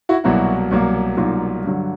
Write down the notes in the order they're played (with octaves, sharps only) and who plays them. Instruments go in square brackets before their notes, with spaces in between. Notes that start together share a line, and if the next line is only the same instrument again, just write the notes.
[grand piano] E4 F#4
C2 B2 F#3 A#3 E4 F#4
C2 B2 F#3 A#3
C2 B2 F#3 A#3 D#4 F4
G2 D3 F#3